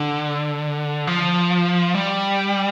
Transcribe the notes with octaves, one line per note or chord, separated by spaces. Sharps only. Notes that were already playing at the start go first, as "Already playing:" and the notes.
Already playing: D3
F3
G3